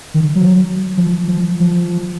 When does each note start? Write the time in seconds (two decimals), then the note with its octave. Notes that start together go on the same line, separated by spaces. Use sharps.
0.14 D#3
0.35 F#3
0.97 F3
1.28 F3
1.60 F3